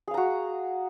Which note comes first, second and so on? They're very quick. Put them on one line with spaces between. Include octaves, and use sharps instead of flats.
G#4 F5 A#5 F#4